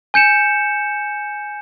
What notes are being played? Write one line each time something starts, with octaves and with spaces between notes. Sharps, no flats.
G#5 G6 C#7 E7